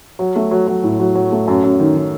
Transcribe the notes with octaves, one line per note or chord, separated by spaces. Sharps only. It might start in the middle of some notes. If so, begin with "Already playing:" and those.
F#3
A3
F#3
F#3
A2
F#3
F#3
A3
F#2
F#2
D#3
D#3